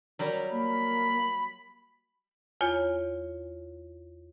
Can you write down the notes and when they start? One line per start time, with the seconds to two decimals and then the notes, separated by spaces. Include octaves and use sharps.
0.19 F#3 G3 A#4
0.51 A#3 B5
2.61 E2 F4 C#5 G#5